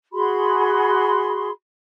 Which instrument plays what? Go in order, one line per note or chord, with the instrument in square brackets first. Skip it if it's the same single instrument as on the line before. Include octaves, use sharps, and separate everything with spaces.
[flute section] F#4 G#4 B5 C6